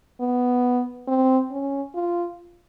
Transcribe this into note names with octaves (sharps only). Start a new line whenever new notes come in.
B3
C4
C#4
F4